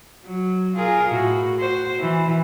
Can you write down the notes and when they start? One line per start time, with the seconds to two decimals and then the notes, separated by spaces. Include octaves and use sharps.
0.25 F#3
0.76 F4 G#4 A#4
1.08 A2 F#4
1.60 F#4 C5
1.99 E3